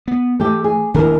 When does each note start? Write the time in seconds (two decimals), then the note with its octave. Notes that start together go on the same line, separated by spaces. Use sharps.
0.08 B3
0.40 E3 A3 G4
0.64 G#4
0.94 E1 D#2 D#3 E3 D4 A#4